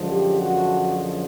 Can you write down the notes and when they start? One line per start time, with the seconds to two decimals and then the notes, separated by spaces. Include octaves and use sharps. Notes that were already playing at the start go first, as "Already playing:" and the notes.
Already playing: F#2 D3 F3 G#3
0.08 G4
0.39 F#4